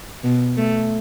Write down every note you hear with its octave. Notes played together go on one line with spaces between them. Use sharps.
B2
A3